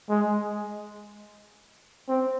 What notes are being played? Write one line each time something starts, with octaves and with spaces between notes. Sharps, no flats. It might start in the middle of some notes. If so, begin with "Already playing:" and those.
G#3
C4